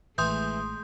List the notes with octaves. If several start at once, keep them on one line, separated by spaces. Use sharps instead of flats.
A1 E3 G#3 A3 C6 D#6 G6